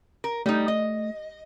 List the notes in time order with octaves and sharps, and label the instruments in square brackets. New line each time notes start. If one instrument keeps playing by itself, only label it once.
[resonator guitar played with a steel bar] A#4
[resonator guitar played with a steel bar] G3 D#4 [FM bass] A3
[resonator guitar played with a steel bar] D#5